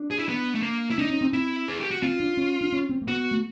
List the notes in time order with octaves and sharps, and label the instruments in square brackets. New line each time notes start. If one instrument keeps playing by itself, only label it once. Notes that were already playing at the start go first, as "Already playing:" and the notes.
Already playing: [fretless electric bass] D4
[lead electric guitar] G#4
E4
B3
A3
A#3
E4
[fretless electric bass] D4 [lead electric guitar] D#4
[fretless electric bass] C#4
C4
[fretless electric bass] C4 [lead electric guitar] E4
[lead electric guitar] G#4
G4
F#4
[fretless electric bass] C4 [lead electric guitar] F4
[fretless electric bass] D4
C#4
D4
C#4
C4
A#3
[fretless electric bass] B3 [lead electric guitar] F#4
[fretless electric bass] A3